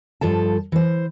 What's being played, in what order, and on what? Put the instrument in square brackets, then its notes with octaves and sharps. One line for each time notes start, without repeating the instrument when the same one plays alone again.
[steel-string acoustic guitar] G2 F3 A4 A5
E3 C5